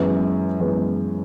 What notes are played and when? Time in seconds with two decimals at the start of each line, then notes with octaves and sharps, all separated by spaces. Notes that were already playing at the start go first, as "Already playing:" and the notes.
Already playing: F#2 E3 G#3 B3
0.60 F#2 E3 G#3 B3